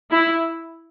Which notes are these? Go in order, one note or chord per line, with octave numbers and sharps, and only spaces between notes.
E4